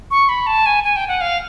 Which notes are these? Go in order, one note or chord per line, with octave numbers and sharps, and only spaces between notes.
C#6
B5
A5
G#5
G#5
G5
F#5
F5